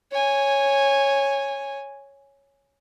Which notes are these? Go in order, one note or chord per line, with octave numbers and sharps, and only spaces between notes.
C#5 G#5